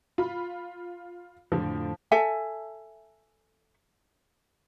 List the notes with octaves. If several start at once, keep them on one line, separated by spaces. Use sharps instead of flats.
F4 B5
F2 A2 D3 F3
A4 E5 G#5